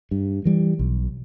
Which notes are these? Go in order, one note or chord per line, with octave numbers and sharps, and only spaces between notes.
G2
E3 G3
B1